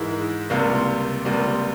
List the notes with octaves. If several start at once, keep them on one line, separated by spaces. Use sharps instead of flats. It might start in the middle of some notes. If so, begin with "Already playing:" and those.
Already playing: G#2 E3 G#3 E4 A#4
C#2 C3 G3 A#3
C#2 C3 G3 A#3